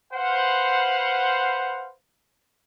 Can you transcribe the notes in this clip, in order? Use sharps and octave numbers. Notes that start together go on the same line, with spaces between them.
B4 C5 F5 F#5